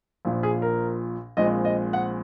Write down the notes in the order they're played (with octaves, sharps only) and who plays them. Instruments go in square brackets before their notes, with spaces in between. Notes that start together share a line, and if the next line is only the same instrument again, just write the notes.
[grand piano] A#1 A#2 F3
G#4
A#4
A#1 A#2 G#3 C4 D#5
D#5
F#5